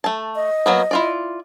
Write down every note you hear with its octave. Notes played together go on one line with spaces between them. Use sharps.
A3 A5
D#5
F#3 A#3 B3
E4 F4 D5